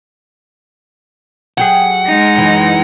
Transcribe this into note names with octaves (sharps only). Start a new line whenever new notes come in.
F#3 G4 G#4 F#5
G#3 D#4
F#2 E3